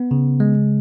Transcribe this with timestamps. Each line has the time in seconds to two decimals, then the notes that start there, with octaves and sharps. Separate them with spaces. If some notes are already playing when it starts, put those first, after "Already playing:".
Already playing: B3
0.11 C#3
0.40 G#3